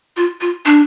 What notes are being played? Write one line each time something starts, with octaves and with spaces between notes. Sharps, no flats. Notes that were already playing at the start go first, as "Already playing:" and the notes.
F4
F4
D4